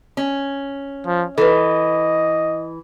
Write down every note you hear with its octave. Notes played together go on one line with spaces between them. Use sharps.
C#4
F3
E3 A4 B4 D#5